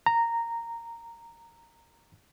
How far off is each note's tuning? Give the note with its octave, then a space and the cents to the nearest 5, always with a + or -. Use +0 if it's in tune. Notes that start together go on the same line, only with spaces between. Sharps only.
A#5 -10